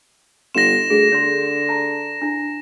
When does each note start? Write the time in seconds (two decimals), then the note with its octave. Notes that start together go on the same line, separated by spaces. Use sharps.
0.55 G1 C6 A#6 E7
0.90 D2 G#4
1.12 D3 C#5 C6
1.69 D5 A5 A#5
2.22 D4 E4